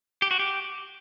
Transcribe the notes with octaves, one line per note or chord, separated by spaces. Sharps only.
G4
F#4
G4